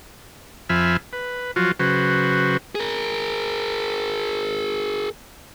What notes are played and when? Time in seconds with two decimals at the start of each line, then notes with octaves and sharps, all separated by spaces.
0.69 F2 F3 E5 G#5 B5 F6
1.13 B4
1.56 F3 F#3 F4 F#4
1.79 C#3 F#3 F#4 B4 C5
2.75 G#4 A#4